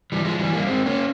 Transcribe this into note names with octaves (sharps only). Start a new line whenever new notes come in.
E3 G3
F3 G#3
E3 G3
G3 A#3
G#3 C4
A#3 C#4